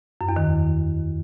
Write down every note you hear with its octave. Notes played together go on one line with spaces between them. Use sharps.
F#2
E2
D#3